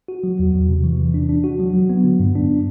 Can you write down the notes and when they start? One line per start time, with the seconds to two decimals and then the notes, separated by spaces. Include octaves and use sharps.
0.08 F#4
0.23 F#3
0.39 E2
0.53 E2
0.69 C3
0.84 E3
0.99 E3
1.14 D4
1.29 D4
1.44 F#4
1.59 F#3
1.74 F#3
1.90 B3
2.04 D3
2.20 G2
2.35 D4